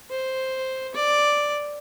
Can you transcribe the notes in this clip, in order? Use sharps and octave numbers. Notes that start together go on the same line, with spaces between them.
C5
D5